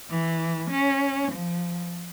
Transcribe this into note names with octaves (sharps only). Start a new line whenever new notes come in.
E3
C#4
F3